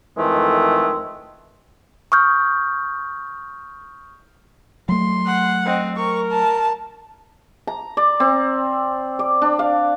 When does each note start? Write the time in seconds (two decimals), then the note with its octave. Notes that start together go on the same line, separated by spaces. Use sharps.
0.18 F2 D#3 E3 G#3 A3
2.12 C#6 D#6 F6 G6
4.89 F#3 A3 C6
5.26 F#5
5.65 C4 D#5
5.96 A#4 C#6
6.31 A5
7.67 A#5
7.97 D5
8.20 C4
9.19 D5
9.42 D4
9.59 F5